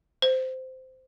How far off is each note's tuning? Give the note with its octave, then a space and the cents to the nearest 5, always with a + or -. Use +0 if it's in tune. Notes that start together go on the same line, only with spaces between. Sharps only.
C5 -15